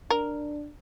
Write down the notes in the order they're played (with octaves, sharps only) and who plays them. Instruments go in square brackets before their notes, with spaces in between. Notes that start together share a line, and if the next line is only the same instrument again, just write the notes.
[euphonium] D4 [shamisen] A#4